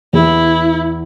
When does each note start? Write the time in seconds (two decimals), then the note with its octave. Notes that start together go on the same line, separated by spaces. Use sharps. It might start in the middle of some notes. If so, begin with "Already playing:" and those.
0.13 E2 E4